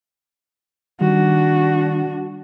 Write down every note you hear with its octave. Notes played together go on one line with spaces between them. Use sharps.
D#3 G3 D4 F#4